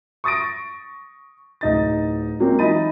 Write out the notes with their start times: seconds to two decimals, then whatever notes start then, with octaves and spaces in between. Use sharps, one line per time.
0.24 C#6 D#6 A6 A#6 D7
1.61 D1 D#4 A6
2.40 F#3 G#3 A#3 C4
2.59 E3 D#4 B5 A6 D#7